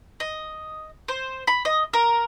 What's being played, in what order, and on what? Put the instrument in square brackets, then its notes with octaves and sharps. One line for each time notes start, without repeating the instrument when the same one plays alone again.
[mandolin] D#5
C5
B5
D#5
A#4